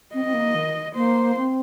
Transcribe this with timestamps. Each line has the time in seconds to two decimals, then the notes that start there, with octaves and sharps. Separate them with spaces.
0.14 C4 D#5
0.25 C4
0.34 A#3
0.55 D#3
0.95 A#3 C5
1.37 C4